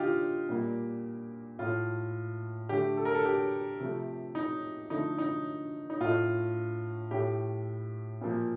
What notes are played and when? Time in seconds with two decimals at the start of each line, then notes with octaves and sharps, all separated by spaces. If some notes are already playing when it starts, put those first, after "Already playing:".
Already playing: D3 D#4 F4 G4
0.49 A#2 G3 A#3
1.59 A2 A3 F4
2.69 D3 A3 G4
2.97 A4
3.05 A#4
3.14 A4
3.25 G4
3.80 C3 F3 A3
4.35 D#4
4.90 D3 F3 A3 D#4
5.18 D#4
5.90 D#4
6.00 A2 A3 F4
7.11 A2 A3 G4
8.21 A#2 F3 A#3